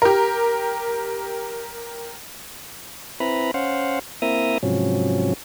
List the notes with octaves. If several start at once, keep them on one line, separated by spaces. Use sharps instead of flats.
G4 A#4
C4 E4 B4 A#5 B5
C#4 C5 F5 F#5
A#3 C4 E4 E5 A#5 D#6
G#2 C3 F3 F#3 C#4